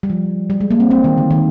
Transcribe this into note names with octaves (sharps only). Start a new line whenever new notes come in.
G3
F3
G3
G#3
A#3
C4
C4
D#3
D3
D#3